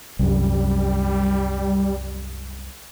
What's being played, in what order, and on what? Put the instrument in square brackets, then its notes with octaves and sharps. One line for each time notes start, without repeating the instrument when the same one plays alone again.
[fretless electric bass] C2 F#2 [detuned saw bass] G3